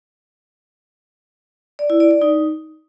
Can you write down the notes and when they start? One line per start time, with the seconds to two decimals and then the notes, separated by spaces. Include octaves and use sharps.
1.79 D5
1.90 E4
2.00 D5
2.11 D5
2.22 D#4